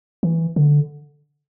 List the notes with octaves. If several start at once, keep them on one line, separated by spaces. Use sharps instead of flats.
E3
D3